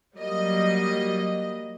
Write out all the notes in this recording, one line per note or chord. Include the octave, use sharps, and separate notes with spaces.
F#3 G3 A#3 D#5